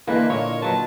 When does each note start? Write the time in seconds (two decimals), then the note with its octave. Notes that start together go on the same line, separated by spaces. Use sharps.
0.07 D3 E3 A#3 B4 D#5 C6
0.30 A#2 C#5
0.62 F#3 B4 A5